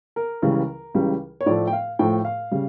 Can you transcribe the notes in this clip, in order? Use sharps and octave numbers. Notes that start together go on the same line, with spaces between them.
A#4
C#2 C#3 E3 G3
C#2 C#3 E3 G3
C#5
A2 F3 A3 D5
G5
F5
A2 F3 A3 G5
F5
C#3 G3